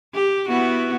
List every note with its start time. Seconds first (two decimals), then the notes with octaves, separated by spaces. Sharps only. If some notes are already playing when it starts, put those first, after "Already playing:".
0.15 G4
0.49 B3 E4 F#4